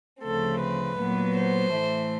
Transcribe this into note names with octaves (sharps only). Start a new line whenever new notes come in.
D2 C#3 F3 A3 C4 A4
B4
A#2 F#3 B3
C5
A2 E3 A3